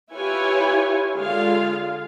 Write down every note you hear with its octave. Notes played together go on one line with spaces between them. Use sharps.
E4 F4 G4 B4 C#5 G#5
D3 G#3 F4 F5